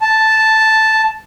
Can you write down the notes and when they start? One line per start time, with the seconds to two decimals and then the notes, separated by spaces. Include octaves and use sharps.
0.01 A5